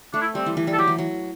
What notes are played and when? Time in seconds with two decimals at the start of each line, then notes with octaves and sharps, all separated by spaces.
0.13 A3 D4
0.21 E4
0.35 G3 C4
0.46 E3
0.57 E3
0.67 G3
0.73 A4
0.78 F#3 G4
0.88 E3
0.98 F#3